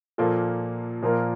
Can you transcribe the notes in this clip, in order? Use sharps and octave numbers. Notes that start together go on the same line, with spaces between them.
A#2 F3 A#3 F4 A4
A#2 F3 A#3 F4 A#4